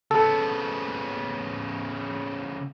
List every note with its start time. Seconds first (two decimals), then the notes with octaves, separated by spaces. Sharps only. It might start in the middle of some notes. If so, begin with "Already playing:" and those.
0.11 C#3 B3 A4